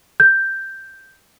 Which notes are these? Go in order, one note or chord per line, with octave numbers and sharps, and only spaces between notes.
G6